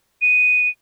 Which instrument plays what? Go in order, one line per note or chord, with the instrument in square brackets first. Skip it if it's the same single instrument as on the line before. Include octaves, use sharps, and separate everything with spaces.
[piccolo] D#7